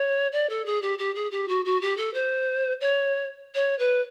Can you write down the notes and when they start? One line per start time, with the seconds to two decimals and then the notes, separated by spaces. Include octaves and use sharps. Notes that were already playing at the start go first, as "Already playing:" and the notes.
Already playing: C#5
0.32 D5
0.49 A4
0.65 G#4
0.82 G4
0.98 G4
1.15 G#4
1.31 G4
1.48 F#4
1.65 F#4
1.81 G4
1.97 A4
2.14 C5
2.80 C#5
3.54 C#5
3.78 B4